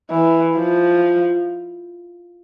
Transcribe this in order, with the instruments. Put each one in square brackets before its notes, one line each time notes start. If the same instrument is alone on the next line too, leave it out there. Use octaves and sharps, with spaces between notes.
[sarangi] E3
F3